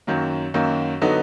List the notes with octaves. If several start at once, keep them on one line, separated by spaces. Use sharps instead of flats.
F#2 D#3 F#3 A#3
F#2 D#3 F#3 A#3
D3 F#3 B3 D#4